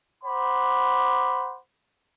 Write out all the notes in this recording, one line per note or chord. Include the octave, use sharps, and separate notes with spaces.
C5 F#5 B5 D6